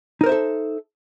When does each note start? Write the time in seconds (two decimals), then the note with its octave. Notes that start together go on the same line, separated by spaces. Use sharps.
0.21 D#4
0.24 A#4
0.26 C5
0.29 E5
0.32 A4